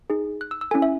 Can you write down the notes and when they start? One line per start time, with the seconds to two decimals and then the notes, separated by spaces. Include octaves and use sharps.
0.10 D#4 G#4
0.41 F#6
0.51 E6
0.61 E6
0.71 C#4 E4 A4 G#5
0.82 E5